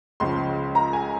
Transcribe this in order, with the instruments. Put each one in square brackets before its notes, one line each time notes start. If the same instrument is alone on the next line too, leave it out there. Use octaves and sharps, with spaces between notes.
[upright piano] C#2 C#3 F3 C6
A#5
G#5